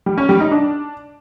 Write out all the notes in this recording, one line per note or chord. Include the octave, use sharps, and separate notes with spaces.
G3
C#4
G3
D#4
D4